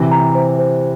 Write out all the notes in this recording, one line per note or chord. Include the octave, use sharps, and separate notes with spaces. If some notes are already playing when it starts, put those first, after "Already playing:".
Already playing: C3 E3
A#5
C5
C5